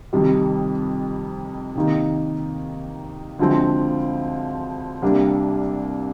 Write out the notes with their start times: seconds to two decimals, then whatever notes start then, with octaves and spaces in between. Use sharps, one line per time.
0.13 F2 C3 D#3 G3
1.75 C3 D#3 A#3 D#4
3.39 D2 D3 F3 G#3 C4
5.02 C2 C3 G3 A#3 D4